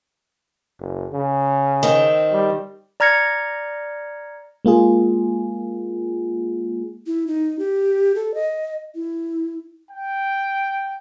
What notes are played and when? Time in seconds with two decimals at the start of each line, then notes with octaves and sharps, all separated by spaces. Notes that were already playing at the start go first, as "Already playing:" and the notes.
0.80 F#1
1.13 C#3
1.83 D#3 C4
2.32 G3
3.00 D5 A#5 F6 G#6 A#6 C#7
4.65 G#3 A#3 F4 G#4
7.07 E4
7.27 D#4
7.59 G4
8.15 A4
8.34 D#5
8.95 E4
9.90 G5